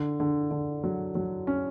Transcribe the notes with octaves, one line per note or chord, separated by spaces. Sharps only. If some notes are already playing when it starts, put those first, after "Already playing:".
Already playing: D3
D3
D3
F#3
F#3
C#4